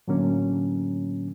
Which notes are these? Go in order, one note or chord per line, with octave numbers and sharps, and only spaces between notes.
A2 D3 F#3 A#3 C#4